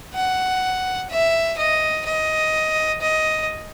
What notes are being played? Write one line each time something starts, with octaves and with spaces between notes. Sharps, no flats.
F#5
E5
D#5
D#5
D#5